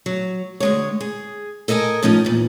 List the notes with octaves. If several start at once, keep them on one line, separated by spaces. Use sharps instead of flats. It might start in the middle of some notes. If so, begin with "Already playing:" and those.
F#3
D2 G#3 C#5
G#4
A4 A#4 D#5 E5 G#5
A2 F3 C#4 D#4
E2 A#2